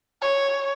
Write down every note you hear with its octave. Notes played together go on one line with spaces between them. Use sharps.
C#5